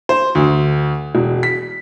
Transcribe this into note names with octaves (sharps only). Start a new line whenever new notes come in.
C5
D2
E1
B6